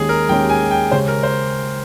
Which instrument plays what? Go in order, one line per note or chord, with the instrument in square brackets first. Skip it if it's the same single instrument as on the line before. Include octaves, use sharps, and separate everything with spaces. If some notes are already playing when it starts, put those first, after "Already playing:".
Already playing: [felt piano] D#2 D#3 G#3 C#4 G4 [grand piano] G#4
[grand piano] A#4
[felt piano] D#2 D#3 G#3 C#4 G4 [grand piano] G5
[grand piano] G#5
G5
[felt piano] C#3 G#3 C#4 G4 C#5 [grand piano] C5
[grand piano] A#4
C5